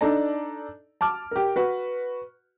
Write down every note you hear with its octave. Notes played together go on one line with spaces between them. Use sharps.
D4 D#4 A4 D5 A#5
A5 D6 F6
G4 A#4
F#4 B4